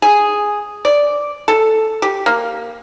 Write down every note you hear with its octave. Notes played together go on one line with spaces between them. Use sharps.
G#4
D5
A4
G4
A#3